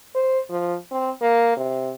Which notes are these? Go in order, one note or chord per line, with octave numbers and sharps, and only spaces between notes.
C5
F3
C4
A#3
C3